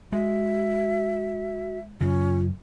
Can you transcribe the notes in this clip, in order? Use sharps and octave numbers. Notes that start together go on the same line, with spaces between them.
G#3 F#4 E5
F#2 C#3 C#4 F4